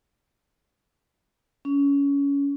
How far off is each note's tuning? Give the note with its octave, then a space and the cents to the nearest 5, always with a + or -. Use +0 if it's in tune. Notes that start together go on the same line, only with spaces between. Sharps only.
C#4 +25